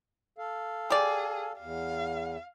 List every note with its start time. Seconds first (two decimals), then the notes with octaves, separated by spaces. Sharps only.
0.38 A4 F5
0.90 G4 G#4 D5
1.59 E2 F5